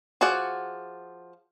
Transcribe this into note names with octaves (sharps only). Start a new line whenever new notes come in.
F3 F#4 G#4 D5 F#5